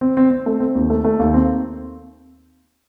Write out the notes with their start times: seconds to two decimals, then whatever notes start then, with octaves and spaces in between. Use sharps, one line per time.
0.01 C4
0.17 C4
0.31 C4
0.46 A3
0.60 C4
0.75 D#2
0.90 A3
1.04 A3
1.19 D#2
1.34 C4